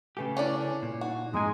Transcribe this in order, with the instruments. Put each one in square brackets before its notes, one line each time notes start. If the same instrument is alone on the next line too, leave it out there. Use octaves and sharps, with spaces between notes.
[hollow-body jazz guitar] C#3 A3 G4 [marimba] B4 G#5
[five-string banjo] C#4 D4 D5 [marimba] E4 C#5
[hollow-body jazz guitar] A#2
[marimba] D#4 [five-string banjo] F#4
[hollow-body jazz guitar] F2 A#3 G#5 [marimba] G#2 F3 A#5 [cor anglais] G#3